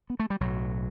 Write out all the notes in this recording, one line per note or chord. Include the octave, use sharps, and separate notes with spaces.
B3
A3
G3
B1 A2 F#3